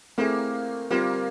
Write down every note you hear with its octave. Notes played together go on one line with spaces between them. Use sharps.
A3 A#3 C4 E4 G#4
G3 A#3 C4 F4